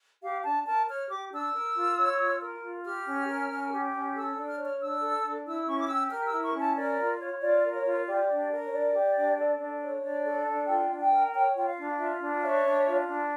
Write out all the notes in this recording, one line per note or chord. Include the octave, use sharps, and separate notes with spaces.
G4 F5
D4 A5
A#4 A5
C#5 F6
G4 D6
D4 E6
A#4
F4
C#5
F4
A#4
F4
G4 F6
C#4
A#4
C#4
G4
C#4
A4 E6
D4
F6
C#5
F6
D4 E6
A4
D4
E4 E6
C#4 C#6
D6
G4 E6
A#4 F6
E6
E4
C#6
C#4
A5
A#4 D5
F4
C#5
F4 D5
A#4
C#5
F4
G4 D5
D4
A#4
C#5
D4 D5
G4
D4
A4
D4
C#5
D4 D5
A4
D4
F4 G5
D4
G5
A#4
C#5 G5
F4 G5
F5
D4
F4 E5
D4
C#5 E5
D4
F4
D4